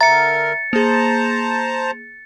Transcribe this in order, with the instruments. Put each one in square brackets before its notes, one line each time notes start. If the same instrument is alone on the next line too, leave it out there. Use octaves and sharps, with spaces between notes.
[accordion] D3 A#4 [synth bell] E5 A#5 [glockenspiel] A6 C#7
[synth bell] A#3 G#4 [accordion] C5 A5 A#5